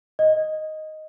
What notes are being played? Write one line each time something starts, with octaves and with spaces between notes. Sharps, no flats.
D#5